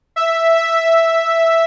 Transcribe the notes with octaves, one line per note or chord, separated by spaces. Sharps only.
E5
E5